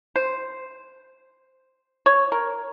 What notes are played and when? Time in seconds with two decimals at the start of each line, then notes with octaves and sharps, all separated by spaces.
0.16 C5
2.06 C#5
2.32 A#4